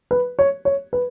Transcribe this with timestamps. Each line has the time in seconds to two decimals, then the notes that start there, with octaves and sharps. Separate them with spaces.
0.11 B4
0.39 C#5
0.65 C#5
0.93 B4